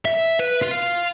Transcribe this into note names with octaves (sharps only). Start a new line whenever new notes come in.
E5
B4
F4